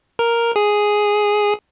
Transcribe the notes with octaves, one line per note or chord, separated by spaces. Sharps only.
A#4
G#4